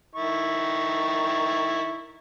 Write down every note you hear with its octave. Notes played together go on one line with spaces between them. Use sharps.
D#3 E4 C#6